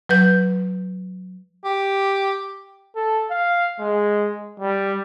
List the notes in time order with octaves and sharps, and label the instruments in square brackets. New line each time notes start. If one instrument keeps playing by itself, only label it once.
[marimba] F#3 B4 G6
[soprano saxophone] G4
[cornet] A4
F5
G#3
G3